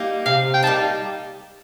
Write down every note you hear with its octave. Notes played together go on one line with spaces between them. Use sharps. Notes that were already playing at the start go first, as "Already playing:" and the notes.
Already playing: G3 A#3 D#4
C3 F5
G5
G3 A#3 D#4 A5